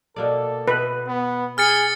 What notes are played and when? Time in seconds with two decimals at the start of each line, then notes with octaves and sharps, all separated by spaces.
0.16 B2 A#3 A4 D5
0.68 B2 B4
1.08 B3
1.58 G#4 F6 A6 C#7